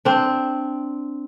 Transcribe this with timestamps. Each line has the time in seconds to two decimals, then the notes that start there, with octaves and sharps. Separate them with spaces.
0.05 C4 D4